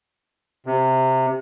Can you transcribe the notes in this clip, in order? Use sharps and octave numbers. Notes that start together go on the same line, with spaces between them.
C3